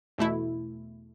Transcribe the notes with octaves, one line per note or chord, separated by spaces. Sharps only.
E2 B2 A3 E4